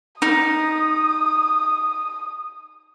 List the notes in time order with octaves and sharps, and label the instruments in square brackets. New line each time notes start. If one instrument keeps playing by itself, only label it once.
[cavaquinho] D#4 [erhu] D#6